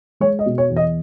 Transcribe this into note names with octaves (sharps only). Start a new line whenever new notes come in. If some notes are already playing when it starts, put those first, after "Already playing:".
G#3 C#5
D#5
B2
C#5
E2
D#5